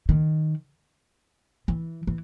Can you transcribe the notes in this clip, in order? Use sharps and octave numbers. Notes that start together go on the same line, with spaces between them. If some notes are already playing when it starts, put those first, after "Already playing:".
D#3
E3
E3